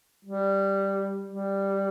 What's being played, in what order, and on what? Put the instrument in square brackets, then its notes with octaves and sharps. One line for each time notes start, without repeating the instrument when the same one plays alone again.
[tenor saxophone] G3
G3